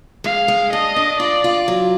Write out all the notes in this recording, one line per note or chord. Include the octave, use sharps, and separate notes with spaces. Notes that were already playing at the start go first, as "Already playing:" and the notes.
G#3 F5
G#3
D4 D#5
D4
F4 D5
F4
F#3